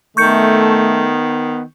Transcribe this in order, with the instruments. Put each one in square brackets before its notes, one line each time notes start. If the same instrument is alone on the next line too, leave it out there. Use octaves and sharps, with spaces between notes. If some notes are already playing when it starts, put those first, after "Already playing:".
[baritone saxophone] D#3 [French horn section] A3 [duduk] B3 [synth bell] C#6 G6 C#7